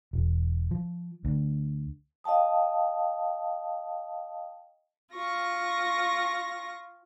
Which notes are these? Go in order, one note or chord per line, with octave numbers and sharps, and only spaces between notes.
E1
F3
D2
D#5 F5 G5 A5 D#6
F4 C#6 A#6